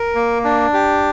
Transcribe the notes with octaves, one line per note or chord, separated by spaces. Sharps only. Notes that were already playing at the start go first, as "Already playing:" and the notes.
Already playing: A#4
A#3
D4
G4